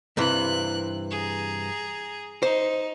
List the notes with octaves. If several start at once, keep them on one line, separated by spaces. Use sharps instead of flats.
G2 C3 E3 A#3 F#6
G#4 A#5
D#4 C5